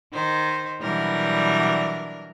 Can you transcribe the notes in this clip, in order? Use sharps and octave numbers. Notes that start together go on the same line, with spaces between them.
D#3 D#4 C5
B2 E3 F#3 G3 D4 A#4